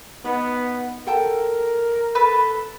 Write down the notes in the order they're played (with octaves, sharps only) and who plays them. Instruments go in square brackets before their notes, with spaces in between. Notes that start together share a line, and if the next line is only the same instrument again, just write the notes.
[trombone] B3 [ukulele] D#4 B4
[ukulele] A4 G5 A5 [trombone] A#4
[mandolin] A4 B4